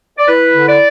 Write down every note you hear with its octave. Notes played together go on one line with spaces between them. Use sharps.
D5
E4 B4
D3
D5